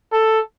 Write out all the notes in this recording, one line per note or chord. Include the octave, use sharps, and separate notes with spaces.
A4